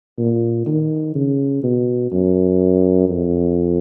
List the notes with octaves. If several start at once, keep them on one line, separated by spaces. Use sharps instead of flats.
A#2
D#3
C#3
B2
F#2
F2